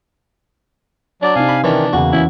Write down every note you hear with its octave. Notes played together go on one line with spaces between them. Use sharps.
F#3 D4 D5
C3 D#4 F5 G#5
B5
D#3 E3 C#4 D4
E2 C#3 E3 A#3 F#4
E2 C#4 E4